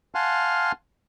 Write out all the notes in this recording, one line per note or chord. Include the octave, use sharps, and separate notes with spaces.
F5 F#5 G#5 A5 C6 F6